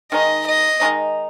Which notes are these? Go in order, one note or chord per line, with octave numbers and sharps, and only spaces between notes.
D#3 G#3 D#4 D#5
D#5
D#3 G#3 D#4